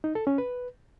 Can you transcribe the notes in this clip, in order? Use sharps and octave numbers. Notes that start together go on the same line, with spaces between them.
D#4
A4
C#4
B4